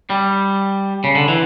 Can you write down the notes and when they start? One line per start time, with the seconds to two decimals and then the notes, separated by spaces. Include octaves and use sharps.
0.10 G3
1.04 C#3
1.16 D3
1.28 E3